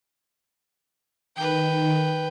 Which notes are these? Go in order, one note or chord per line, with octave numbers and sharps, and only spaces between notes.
D#3 B4 G5